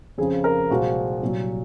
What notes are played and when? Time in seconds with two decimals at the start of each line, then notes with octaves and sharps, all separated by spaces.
0.18 F2 C#3 F3 G#4
0.44 A#4
0.70 C2 A#2 F3 G#3 F#4
1.21 C2 A#2 F#3